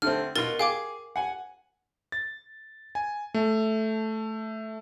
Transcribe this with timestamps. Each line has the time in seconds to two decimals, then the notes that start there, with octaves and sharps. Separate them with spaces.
0.02 D3 A3 C4 F6
0.35 B2 F4 A#4 A6 G7
0.59 G#4 F5 G5 D6
1.16 F#5 G#5
2.12 A6
2.95 G#5
3.34 A3